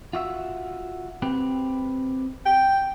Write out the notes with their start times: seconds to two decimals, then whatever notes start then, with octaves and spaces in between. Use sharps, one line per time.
0.13 F4 F#4 E5
1.22 C4 G4 B4
2.46 G5